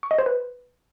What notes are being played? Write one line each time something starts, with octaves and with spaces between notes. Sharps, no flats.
C#6
D#5
C5
B4